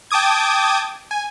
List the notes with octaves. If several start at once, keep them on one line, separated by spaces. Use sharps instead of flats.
G5 A5 D6 D#6 G#6
G#5